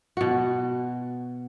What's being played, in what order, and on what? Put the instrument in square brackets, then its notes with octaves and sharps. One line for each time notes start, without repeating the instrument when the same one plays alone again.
[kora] B2 F#4